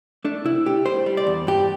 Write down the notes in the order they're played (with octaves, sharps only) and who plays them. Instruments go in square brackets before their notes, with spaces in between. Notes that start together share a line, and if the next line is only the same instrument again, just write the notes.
[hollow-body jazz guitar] A3 D4
C3 E4
A3 G4
G3 C5
G3
D5
E2
G2 G4